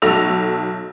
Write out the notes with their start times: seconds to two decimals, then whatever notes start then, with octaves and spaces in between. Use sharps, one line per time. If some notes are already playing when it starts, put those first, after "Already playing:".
0.02 B1 A3 E6 A#6 F7